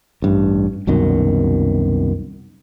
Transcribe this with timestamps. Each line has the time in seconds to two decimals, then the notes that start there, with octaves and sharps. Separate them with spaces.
0.22 A1 G2
0.87 C2 F#2 B2 D#3